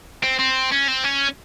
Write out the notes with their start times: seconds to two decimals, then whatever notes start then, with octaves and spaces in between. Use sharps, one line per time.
0.23 C4
0.39 C4
0.71 C#4
0.88 C4
1.04 C#4